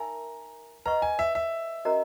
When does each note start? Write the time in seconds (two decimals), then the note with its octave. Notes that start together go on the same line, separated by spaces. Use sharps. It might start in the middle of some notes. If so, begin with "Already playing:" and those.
Already playing: D#4 A#4 E5 G#5 A#5
0.85 B4 D#5 F#5 A#5 C#6
1.02 G#5
1.19 E5
1.35 E5
1.85 C#4 F#4 A#4 D#5 A#5